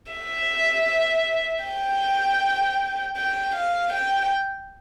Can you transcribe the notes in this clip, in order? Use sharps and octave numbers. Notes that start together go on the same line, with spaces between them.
E5
G5
G5
F5
G5